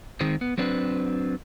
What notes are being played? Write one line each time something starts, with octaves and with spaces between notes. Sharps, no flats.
D#3 G#3 C4
B3
F#3 C4 D4 B4